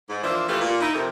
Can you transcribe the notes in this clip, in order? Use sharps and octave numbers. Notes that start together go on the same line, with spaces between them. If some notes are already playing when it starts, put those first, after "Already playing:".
G#2
E3 F3 A#3 D4 C5 E5
E3 A3 E4 F4 G4 B4
A#2
D#4 E4
F2 C3 A#4